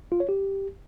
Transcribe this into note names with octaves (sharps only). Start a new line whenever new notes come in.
F4
C#5
G4